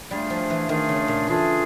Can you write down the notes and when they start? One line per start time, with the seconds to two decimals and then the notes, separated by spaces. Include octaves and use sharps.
0.11 G3 A3 D4 F4 G#4
0.30 F3
0.50 E3
0.69 D#3 A3 D4 F4 G#4
0.89 C#3
1.08 A#2
1.27 E3 A3 D4 F4 G#4